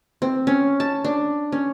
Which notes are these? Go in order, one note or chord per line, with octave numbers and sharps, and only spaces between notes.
C4
C#4
A5
D4
C#4